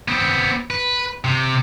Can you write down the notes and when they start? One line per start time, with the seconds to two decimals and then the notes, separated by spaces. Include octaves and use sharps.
0.08 B3 C4
0.70 B4
1.24 C3